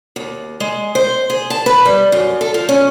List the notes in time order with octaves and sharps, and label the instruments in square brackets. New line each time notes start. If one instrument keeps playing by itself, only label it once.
[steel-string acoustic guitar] D#2
G#3
C5
G#4
A5
B4
G3
F#2
A4
F3
C#4